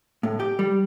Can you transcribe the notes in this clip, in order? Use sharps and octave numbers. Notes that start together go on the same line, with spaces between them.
A2
G4
G3